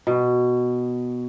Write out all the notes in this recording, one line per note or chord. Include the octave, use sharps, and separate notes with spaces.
B2